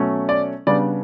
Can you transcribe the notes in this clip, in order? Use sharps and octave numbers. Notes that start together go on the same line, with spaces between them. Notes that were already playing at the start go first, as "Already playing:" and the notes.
Already playing: B2 F#3 A3 C#4
D5
C#3 G3 B3 D4 D5